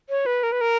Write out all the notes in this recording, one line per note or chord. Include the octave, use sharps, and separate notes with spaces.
C#5
B4
A#4
B4
A#4